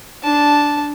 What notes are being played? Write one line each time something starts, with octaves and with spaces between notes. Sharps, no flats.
D4 A5